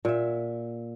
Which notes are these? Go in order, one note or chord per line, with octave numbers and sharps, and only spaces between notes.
A#2 E5